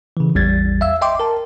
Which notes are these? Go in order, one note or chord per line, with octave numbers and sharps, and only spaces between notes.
C#3 E3
A1 E2 G3 G#6 A6
E5 F5 E6
D#5 E5 G5 C6 D6
A#4 A5